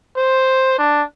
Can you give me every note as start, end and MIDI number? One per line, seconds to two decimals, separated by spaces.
0.17 0.74 72
0.79 1.03 62